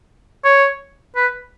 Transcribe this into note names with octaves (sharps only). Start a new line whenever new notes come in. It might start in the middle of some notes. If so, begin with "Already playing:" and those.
C#5
B4